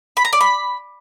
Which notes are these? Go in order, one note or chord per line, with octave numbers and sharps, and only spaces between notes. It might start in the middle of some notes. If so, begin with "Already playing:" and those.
B5
A#5
D5
B5